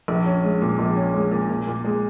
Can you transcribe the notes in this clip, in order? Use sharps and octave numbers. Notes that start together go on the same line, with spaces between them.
A#1
C#4
G#3
A#2
A#1
C#4
G#3
A#2
A#2
A#2
G#3